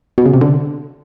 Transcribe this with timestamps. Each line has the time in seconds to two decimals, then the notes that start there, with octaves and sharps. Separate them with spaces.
0.18 B2
0.26 C#3
0.34 C3
0.41 D3